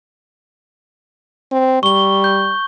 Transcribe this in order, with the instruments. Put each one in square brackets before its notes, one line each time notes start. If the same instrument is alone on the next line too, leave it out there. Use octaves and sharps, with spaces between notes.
[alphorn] C4
[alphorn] G3 [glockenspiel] C#6 G7
[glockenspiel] G6